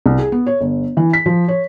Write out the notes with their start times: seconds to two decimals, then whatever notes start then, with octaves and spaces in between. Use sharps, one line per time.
0.06 C2
0.18 G#4
0.32 B3
0.46 C#5
0.61 G1
0.97 E3
1.13 B6
1.26 F3
1.48 C#5